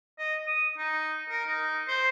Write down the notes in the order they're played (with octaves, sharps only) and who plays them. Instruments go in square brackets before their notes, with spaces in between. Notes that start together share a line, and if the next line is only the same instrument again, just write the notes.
[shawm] D#5
D#6
D#4
A#4
D#4
C5